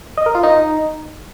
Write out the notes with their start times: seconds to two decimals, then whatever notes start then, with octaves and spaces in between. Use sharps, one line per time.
0.17 D#5
0.26 A#4
0.35 F4
0.43 D#4